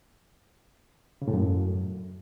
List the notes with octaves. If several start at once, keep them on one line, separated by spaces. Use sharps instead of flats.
C#3
A2
F#2